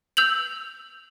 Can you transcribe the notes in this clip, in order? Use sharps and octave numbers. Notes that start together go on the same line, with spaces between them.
E6 G6 F7 F#7